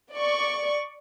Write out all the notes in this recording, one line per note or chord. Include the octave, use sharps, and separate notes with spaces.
D5 C#6